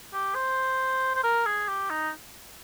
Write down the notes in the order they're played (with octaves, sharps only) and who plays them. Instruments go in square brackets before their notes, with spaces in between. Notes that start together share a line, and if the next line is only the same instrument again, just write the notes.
[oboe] G4
C5
C5
A#4
G#4
G4
D#4